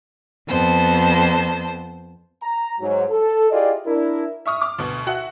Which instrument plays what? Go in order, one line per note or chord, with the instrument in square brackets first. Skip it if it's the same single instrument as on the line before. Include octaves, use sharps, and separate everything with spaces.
[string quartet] F2 B3 C5 A5
[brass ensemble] A#5
G#2 F#3
A4
E4 F4 G4 G#4 D5 D#5
D4 E4 A#4
[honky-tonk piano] E5 C#6 D#6 F6
D6 F6
D2 B2
F#4 E5 F#5